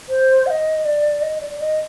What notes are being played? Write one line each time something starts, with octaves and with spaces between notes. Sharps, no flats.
C5
F#5
D#5
D5
D#5
D5
D#5